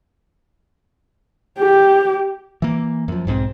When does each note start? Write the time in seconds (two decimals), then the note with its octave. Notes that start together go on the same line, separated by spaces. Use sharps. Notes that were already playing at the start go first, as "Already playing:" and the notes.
1.59 G4
2.62 E3 A#3
3.08 F#2 F3
3.27 B1 G#2 E3 C4